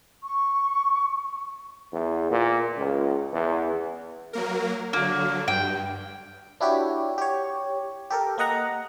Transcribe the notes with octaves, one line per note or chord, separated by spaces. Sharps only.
C#6
E2
A#2
C#2
E2
F#3 A#3 A#4
D3 F#3 A#3
G2 G5
D4 E4 F#4 G4 C#5
G4 C#5
G4 A4 A#4
A#3 A#4 D#5 F#5 A#5